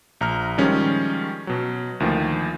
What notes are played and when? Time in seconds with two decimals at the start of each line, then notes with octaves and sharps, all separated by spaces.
0.21 A#1 A#5 F6
0.58 D#3 F3 G3 G#3 C#4
1.47 B2 F#3
2.00 D2 D#3 F3 A#3